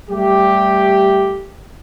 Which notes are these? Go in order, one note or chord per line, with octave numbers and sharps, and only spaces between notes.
G3 A3 G4